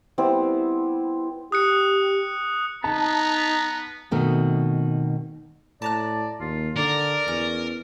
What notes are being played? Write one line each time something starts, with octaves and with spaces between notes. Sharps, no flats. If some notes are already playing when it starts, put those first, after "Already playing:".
G3 B3 C4 E4
G4 D#6 F#6 C#7
B3 D#4 A5 A#5
B2 D#3 A3 C4
A2 D5 A5 A#5 F#6
D#2 F4
D3 A#4 D5
E2 C#4